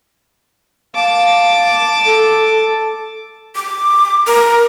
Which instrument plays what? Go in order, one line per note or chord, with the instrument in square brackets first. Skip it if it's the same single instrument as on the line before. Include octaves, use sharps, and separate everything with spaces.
[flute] F5 [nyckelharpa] A5 D6
[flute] A4
[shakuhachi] D6
A#4